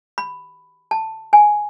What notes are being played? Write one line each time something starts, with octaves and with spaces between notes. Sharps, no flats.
B5
A5
G#5